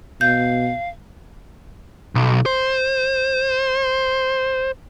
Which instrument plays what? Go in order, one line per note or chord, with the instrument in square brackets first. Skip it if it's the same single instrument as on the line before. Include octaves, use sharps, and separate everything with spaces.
[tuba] B2 [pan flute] F5 [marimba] G6
[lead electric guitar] B1
C5